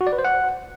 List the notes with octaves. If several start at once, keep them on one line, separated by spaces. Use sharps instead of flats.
F#4
D5
B4
C5
F#5